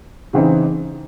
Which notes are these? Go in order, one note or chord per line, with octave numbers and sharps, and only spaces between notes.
C#3 E3 C4 D#4